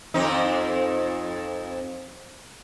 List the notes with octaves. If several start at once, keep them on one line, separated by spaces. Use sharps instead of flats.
F2 C4 D#4